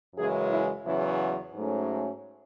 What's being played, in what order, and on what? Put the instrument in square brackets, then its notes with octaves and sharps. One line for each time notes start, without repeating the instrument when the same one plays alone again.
[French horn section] F#2 C#3 E3 G#3 G#4
E4
E2 C#3 F#3 E4
G#2 F#3 A3 C#4